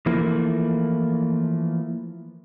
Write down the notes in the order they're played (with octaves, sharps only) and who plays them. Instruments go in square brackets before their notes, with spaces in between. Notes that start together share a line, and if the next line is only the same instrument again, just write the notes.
[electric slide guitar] E3 F3 A3 A#3 E4